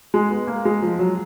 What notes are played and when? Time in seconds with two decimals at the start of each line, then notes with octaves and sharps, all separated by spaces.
0.14 G#3
0.31 B3
0.47 A#3
0.65 G#3
0.83 F3
0.99 F#3